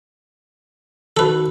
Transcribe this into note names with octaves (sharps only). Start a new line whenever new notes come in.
D#3 D#4 F#4 A4 B4